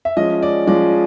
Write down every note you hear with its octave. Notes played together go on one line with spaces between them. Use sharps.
E5
F3 G#3 C#4 D#5
D5
F3 G#3 C#4 D5